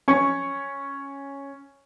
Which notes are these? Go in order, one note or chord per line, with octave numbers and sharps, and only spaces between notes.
C#4 C#6